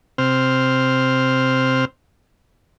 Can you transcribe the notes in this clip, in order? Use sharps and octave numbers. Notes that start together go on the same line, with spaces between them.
C3 C4 C5 F6